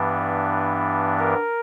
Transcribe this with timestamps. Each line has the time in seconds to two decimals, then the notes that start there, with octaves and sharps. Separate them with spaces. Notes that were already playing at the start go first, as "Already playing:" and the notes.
Already playing: G2 E3 B3 D4
1.19 A#4